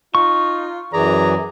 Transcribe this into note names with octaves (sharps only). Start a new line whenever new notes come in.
D#4 F4 C#6
F#2 E3 G#4 D5 A#5